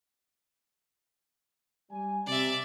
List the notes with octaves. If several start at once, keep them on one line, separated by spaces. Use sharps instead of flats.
G3 G#5
C3 D5 E5